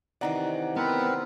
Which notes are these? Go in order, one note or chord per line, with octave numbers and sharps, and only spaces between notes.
C3 D#3 E3 D5 F#5 A#5
B3 C4 A#4 B4